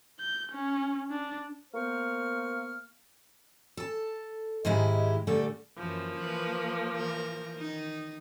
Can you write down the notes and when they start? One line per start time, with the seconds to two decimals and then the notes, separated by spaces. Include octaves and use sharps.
0.20 G6
0.52 C#4
1.11 D4
1.73 A#3 B3 C5 C#6 F6
3.77 A4 A5
4.65 G#2 D#3 G#3 E4 G4
5.27 A#2 D3 G3 A3 A4
5.78 F#2 E3 F3 A#3
6.18 E3 B4
6.96 E3 A#4
7.58 D#3 D#4